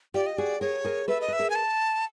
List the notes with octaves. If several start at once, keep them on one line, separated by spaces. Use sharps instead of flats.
F4 G4 D5
D#5
F#4 G#4 D5
G#4 A#4 C#5
G#4 A#4
A4 B4 E5
D#5
B4 E5
G#4 A#4
G#5
A5